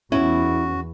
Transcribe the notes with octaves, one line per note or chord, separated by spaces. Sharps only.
E2 C#4 E4 F#4